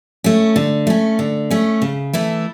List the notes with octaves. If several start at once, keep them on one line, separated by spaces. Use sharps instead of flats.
A3 C#4
D3
A3 C#4
D3
A3 C#4
C#3
E3 A3 E4 A4